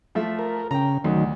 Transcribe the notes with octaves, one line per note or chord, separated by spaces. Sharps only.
F3 A3 E5
A#4
C#3 G5 A#5
D2 D#3 F#3